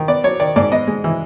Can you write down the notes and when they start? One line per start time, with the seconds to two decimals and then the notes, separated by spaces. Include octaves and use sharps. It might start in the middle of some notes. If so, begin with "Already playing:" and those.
Already playing: D#3
0.08 B3 D5
0.24 F#3 C#5
0.40 D#3 D5
0.56 G#2 D5
0.72 B3 D#5
0.87 G#3
1.04 E3